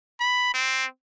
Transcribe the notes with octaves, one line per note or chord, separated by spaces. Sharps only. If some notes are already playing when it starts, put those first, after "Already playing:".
B5
C4